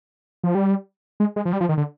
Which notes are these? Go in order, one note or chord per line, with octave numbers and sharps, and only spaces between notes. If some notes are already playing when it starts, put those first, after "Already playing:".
F3
G3
G#3
G#3
F3
G3
F3
D#3
D3